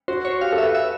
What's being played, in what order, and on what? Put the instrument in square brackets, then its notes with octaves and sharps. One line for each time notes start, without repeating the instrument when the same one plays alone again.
[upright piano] F#4 [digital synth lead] C5
[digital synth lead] C#5
[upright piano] G4 [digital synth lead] F5
[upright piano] A4
[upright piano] B4 [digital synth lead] E5
[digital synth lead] E5